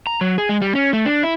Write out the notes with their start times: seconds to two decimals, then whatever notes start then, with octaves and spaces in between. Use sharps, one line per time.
0.07 A#5
0.21 F#3
0.38 G#4
0.49 G#3
0.62 G3
0.75 C#4
0.93 A3
1.06 D4
1.23 E4